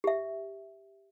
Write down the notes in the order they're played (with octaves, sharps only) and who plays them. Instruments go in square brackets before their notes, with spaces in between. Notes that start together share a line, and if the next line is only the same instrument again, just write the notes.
[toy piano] G4 E5